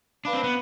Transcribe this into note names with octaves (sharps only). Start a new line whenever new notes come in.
D4 B4 F5 B5 D6
C4
B3